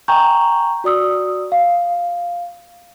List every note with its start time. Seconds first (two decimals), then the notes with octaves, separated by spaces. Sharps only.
0.08 G5 G#5 A#5 C#6 G6
0.84 F#4 D5 D#6 E6
1.52 F5